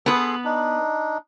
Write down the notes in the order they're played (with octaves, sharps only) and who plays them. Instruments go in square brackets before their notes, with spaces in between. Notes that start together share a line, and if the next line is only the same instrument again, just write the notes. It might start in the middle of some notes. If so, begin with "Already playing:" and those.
[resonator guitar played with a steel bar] B3 B4 [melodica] G#4 A4 C6
[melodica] D4 D#4